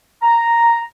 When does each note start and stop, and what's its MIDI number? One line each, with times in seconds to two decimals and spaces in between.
0.23 0.80 82